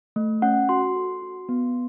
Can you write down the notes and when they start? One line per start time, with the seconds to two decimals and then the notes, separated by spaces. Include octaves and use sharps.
0.16 A3
0.42 C#4 F#5
0.69 F#4 C6
0.96 A4
1.22 F#4
1.49 B3